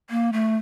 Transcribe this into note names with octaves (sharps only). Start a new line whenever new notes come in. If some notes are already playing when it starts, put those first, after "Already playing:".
A#3
A3